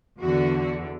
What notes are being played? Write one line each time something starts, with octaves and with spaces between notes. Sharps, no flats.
E2 D3 F#4